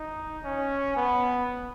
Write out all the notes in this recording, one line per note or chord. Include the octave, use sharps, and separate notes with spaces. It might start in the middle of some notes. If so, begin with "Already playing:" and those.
Already playing: D#4
C#4
B3